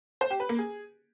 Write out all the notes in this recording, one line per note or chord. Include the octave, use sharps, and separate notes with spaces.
C5
G4
B4
A#3
G#4